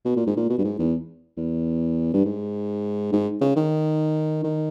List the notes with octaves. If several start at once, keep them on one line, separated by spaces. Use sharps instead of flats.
B2
A#2
G#2
A#2
B2
G2
G#2
E2
E2
G2
G#2
G#2
C#3
D#3
D#3